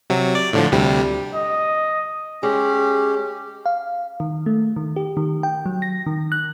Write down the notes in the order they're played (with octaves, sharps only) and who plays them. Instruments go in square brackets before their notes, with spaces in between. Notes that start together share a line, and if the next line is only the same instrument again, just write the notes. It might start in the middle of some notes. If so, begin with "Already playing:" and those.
[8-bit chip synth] C3 F#3
D5
A2 D3 F3
D2 C3 G3
[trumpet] D#5
[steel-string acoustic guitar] G#3 [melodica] C#4 G4
[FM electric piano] F5
D#3
A3
D#3
G4
D#3
G5
F#3
A#6
D#3
F#6